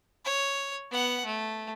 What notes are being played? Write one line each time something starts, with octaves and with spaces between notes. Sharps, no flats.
C#5
B3 F#5
A3